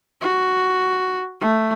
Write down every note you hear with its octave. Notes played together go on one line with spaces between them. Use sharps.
F#4
A3